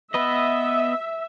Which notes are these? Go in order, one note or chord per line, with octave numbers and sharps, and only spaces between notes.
B3 B4 D#5 E5